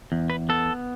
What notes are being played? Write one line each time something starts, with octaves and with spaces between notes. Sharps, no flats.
E2
B4
B3 A4